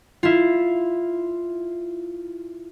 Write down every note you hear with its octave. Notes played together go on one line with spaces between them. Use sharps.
E4 F4